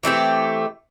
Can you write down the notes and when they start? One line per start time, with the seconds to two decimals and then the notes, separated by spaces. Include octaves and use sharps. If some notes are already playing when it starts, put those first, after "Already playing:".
0.03 E3 A3 C4 G4